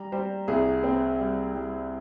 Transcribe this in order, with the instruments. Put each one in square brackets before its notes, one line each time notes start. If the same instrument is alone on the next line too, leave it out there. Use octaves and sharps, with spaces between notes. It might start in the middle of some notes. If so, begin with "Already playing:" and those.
Already playing: [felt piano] G3 A#5
G3 C5
C2 G#4
C4
G3
G3